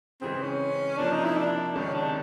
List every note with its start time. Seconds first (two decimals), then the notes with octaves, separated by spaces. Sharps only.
0.21 C#3 E3 G#3 C4
0.41 C#4
0.98 C3 F3 A#3 D4
1.12 D#4
1.25 E4
1.37 D4
1.76 C#2 C3 D#3 G#3 C#4
1.94 D4